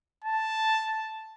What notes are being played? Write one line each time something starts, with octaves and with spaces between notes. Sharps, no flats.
A5